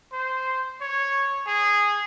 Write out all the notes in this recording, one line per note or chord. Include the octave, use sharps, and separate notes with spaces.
C5
C#5
G#4